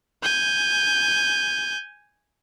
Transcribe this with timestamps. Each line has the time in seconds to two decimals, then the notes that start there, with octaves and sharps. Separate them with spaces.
0.23 G#5 G6